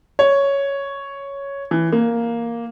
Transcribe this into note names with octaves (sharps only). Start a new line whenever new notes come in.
C#5
E3
A#3